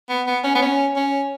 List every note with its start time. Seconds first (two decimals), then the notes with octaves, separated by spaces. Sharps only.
0.09 B3
0.26 B3
0.44 C#4
0.55 B3
0.62 C#4
0.96 C#4